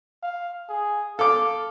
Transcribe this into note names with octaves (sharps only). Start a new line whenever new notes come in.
F5
G#4
A4 F5 D6